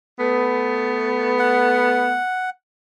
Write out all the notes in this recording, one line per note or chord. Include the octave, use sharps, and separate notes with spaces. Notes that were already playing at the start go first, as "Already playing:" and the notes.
A3 B3
F#5